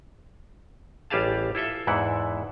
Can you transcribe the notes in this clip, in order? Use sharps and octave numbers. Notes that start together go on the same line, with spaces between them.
A1 G3 G4 G#4 F5 A5
E4 F4 A4 E5
E2 G#2 E3 E4 F#5